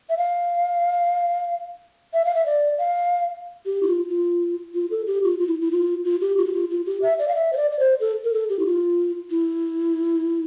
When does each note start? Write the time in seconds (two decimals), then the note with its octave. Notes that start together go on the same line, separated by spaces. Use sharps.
0.09 E5
0.17 F5
2.14 E5
2.25 F5
2.35 E5
2.46 D5
2.79 F5
3.66 G4
3.83 E4
3.87 F4
4.09 F4
4.75 F4
4.91 A4
5.07 G4
5.24 F4
5.40 F4
5.47 E4
5.61 E4
5.72 F4
6.05 F4
6.21 G4
6.37 F4
6.46 G4
6.54 F4
6.70 F4
6.86 G4
7.02 E5
7.19 D5
7.28 F5
7.35 E5
7.53 C5
7.57 D5
7.71 D5
7.79 C5
8.00 A4
8.24 A#4
8.33 A4
8.50 G4
8.59 E4
8.66 F4
9.31 E4